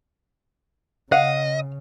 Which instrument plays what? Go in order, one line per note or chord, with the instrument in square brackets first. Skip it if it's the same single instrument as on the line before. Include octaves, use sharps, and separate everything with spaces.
[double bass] C#3 [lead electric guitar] D#5 [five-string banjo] F5 [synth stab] F#5